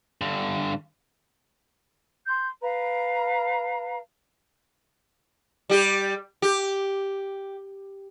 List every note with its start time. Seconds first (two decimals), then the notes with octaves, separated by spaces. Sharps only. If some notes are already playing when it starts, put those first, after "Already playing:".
0.21 G2 D3
2.26 C6 G6
2.62 B4 F5 A#5
5.70 G3 G4
6.42 G4